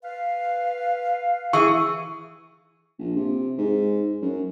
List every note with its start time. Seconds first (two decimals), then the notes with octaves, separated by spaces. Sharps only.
0.03 B4 F5
1.53 E3 G#4 C#6
2.98 A#1
3.16 C3
3.58 G#2
4.22 F#2